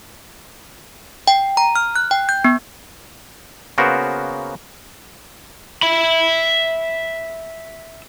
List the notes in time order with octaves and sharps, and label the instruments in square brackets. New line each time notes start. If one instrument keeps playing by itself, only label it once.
[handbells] G5
A#5
F6
F#6
G5
G6
B3
[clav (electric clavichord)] C#3 A#3 B3 F#4 A#4 C5
[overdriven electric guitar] E5 B5